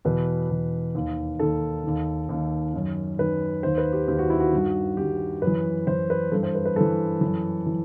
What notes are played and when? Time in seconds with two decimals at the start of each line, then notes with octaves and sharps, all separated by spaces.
0.05 E2 B2 B4
0.50 E2 B2
0.95 D#2 D#3
1.39 D#2 D#3 A4
1.84 D#2 D#3
2.29 D#2 D#3
2.74 F#2 D#3
3.18 F#2 D#3 B4
3.63 D#2 D#3 C5
3.78 B4
3.93 G4
4.07 D#2 D#3 G4
4.19 F#4
4.30 E4
4.40 F#4
4.52 G2 D#3
4.97 G2 D#3 G4
5.42 F#2 B4
5.47 E3
5.87 F#2 E3 C5
6.10 B4
6.31 G2 E3 A4
6.43 C5
6.55 B4
6.65 B4
6.76 G2 E3 A4
7.21 F#2 E3
7.66 E3